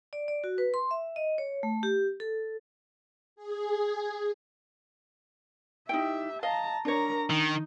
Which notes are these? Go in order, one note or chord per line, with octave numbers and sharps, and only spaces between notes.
D5
D5
F#4
B4
C6
E5
D#5
C#5
A3
G4
A4
G#4
D#4 E4 G4 E5 G5
D#5 F5 A5 A#5
D4 A#4 C#5 A#5
D#3 D#4